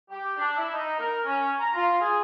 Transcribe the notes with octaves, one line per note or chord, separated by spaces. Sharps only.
G4
D4
E4
D#4
A#4
C#4
A#5
F4
G#4